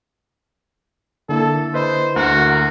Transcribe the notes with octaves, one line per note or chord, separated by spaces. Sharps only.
D3 A#3 E4 A4
B4 C5 D#5 B5
D2 F#4 A#4